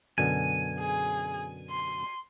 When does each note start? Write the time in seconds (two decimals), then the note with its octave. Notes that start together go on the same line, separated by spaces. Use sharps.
0.18 F#2 B2 D3 G#5
0.79 G#4
1.70 C6